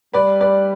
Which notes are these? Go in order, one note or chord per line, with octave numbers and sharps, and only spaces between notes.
G3 B4 D5
B4 D5